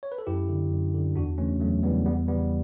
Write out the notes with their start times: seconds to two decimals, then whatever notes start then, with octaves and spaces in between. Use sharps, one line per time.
0.03 C#5
0.12 B4
0.18 A4
0.27 F#2 E4 G4
0.49 D3
0.71 F#2
0.94 D3
1.16 E2 D4 F#4
1.38 C#3 E3 A3 C#4
1.60 E2 F#3 A3
1.83 C#3 E3 G3 B3
2.05 E2 G3 B3
2.27 C#3 E3 G3 B3